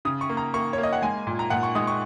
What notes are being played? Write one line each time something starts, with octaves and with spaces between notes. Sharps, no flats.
C#3 D#6
C#6
A#3
A#5
A#3 C#6
C#5
A#3
D#5
F#5
G#3 G#5
A#2
A#5
A#2 F#5
C#6
G#3 D#6
C#6